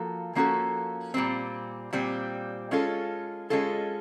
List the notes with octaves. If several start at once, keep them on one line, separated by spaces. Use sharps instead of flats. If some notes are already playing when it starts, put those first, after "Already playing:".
Already playing: F3 A#3 F#4 A4
F3 A#3 C#4 F#4 A4
A#2 G3 C4
A#2 G3 C4
G#3 C#4 F4 A4
G#3 C#4 F4 A4